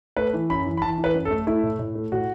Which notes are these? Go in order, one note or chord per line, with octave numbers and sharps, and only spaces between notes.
A3 B4
E3
F#2 B5
E3
B5
E3 A5
E3
B4
F#2
A4
A3
A3 E4
A2
A2
A3
A2 F#4